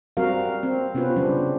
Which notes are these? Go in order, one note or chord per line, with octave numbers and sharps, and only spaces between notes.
G3 C4 F#4 A#4 F5
C4
C3 B3 C#4 F4 B4 C5
C#3 G3 D4